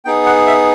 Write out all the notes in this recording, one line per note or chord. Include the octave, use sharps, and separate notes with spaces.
B3 D#4 G#4 G5
F#5
E5